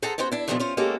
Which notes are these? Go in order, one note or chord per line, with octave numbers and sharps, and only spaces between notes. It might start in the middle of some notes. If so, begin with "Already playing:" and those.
G#4 A4 C5 F#5 A5 A#5
B3 C#4 F#4 C5
D4 E4
B2 D3 E3 F3 D4 F4
C#4 F4 C5
G#3 A#3 C#4 F#4 G4 A4